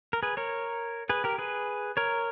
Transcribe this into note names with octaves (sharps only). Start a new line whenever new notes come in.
A#4
G#4 B4
A#4 C#5
G#4 B4
G4 A#4
G#4 B4
A#4 C#5